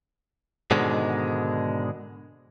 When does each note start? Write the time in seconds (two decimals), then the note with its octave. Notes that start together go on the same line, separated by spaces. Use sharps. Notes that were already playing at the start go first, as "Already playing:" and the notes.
0.71 G#2 B2 D3 D#3 G#3